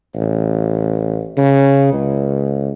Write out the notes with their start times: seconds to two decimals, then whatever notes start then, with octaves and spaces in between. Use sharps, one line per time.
0.16 A1
1.37 C#3
1.93 C#2